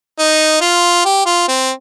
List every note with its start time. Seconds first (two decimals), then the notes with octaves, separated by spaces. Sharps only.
0.19 D#4
0.61 F4
1.05 G4
1.26 F4
1.48 C4